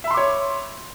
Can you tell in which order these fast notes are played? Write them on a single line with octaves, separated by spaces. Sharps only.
E5 B5 C6 D6 C#5